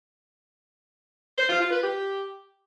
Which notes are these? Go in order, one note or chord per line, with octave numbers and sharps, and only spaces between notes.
C5
F4
F4
B4
G4